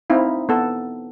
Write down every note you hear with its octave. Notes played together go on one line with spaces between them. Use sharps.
C4 D#4 E4 F5
B3 A4